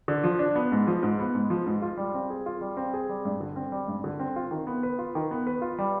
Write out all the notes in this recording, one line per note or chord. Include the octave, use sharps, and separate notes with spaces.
D3
F3
D4
B3
G#2
F3
G#2
B3
G#2
F3
G#2
F4
G3
C4
G#4
F4
G3
C4
G#4
G3
G2
D3
C4
G3
G2
D3
C4
F4
D#3
B3
B4
F4
D#3
B3
B4
F4
G3